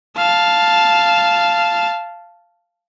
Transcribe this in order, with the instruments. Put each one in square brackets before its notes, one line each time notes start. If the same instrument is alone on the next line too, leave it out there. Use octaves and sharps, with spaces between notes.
[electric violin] F5 A5